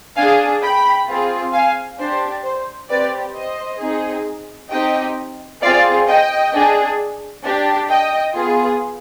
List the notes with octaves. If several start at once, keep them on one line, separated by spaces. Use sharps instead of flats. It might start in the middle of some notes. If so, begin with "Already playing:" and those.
D4 G#4 F5 G#5
G5 B5
C4 F4 G#4
F5 G#5
D4 G4 C5
C5
C4 G4 B4 D5
C5 D#5
C4 D#4 G#4
C4 D#4 G4 D#5 G5
C4 F4 G#4 D5 F5
D#5 G5
D4 G#4
D4 G4
D#5 G5
B3 F4 G#4